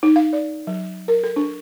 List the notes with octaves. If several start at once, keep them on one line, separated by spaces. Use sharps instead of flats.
D#4
F5
D5
F#3
A#4
A4
D4